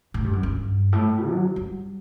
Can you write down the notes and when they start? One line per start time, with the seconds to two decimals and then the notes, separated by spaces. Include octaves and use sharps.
0.14 A2
0.24 G2
0.33 F#2
0.43 G2
0.92 A2
1.30 F#3
1.56 G3